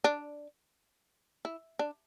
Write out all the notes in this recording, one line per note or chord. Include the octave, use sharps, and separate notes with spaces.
D4
E4
D4